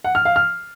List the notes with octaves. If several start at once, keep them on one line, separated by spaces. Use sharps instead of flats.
F#5
F6
F5
F6